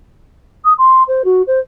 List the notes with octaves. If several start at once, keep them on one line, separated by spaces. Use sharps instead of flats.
D#6
C6
C5
F#4
C5